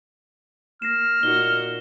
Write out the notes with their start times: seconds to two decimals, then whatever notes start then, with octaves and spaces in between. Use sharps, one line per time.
0.82 A#3 F6 A#6 C7 E7
1.23 A#2 D#4 F#4 G7